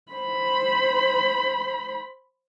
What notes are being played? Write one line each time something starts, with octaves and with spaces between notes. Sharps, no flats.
C5 B5